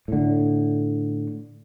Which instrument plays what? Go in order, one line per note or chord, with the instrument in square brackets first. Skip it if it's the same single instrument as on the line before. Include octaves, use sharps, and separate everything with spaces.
[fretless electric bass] A2 D3